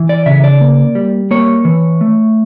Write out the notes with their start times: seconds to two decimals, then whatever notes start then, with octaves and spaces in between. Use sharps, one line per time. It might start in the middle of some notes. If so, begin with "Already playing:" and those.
Already playing: E3
0.09 D5
0.26 C#3 E5
0.44 D5
0.61 A#3
0.95 G3
1.31 A#3 C#5
1.65 E3
2.01 A3